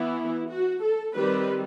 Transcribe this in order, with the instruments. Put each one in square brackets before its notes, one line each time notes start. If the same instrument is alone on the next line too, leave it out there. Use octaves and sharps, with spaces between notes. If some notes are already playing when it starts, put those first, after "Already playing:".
Already playing: [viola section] E3 B3 E4
F#4
A4
D#3 G3 C4 B4